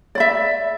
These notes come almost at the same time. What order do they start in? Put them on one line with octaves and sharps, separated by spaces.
D5 B5 E5